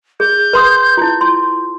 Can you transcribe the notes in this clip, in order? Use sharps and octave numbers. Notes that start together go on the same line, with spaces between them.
G#4 G6
B4 C6 D#6
E4 F4
C6